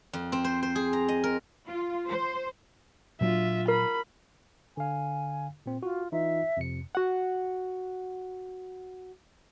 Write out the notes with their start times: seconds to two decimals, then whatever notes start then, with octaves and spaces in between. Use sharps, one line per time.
0.13 F2
0.32 C4
0.44 C5
0.63 C5
0.75 G#4
0.93 A#5
1.08 D#5
1.24 A#4
1.66 F4
2.09 C5
3.21 A#2 F#3 D4 F4 E5
3.68 A#4 B5
4.77 D3 F5 G#5
5.66 A#2 C4
5.83 F4 F#4
6.12 E3 D#4 F4 E5
6.57 F2 C3 C#7
6.95 F#4 F#5